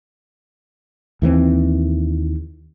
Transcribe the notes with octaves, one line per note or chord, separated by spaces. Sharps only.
D#2 E3 A3 C4